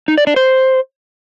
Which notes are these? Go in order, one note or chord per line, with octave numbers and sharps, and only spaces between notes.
D#4
D5
D4
C5